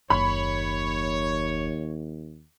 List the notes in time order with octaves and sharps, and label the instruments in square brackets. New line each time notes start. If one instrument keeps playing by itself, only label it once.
[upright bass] F#1 [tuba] D#2 [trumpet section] C#5 [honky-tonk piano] B5